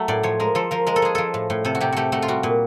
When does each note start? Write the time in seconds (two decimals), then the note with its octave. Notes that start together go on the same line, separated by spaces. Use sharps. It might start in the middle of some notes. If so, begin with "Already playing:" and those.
Already playing: F#3 A3
0.08 A2 D5
0.23 F3 C#5
0.40 G#3 A#4
0.55 F3 A4
0.71 F3 A#4
0.86 G#3 A#4
0.96 A4
1.02 G#3 G#4
1.15 F3 A4
1.34 A2
1.50 A2
1.65 C3 A4
1.75 F#4
1.81 C3 G4
1.92 A3 F#4 G4
2.12 A3 F#4
2.22 F4
2.28 G3 F#4
2.43 A#2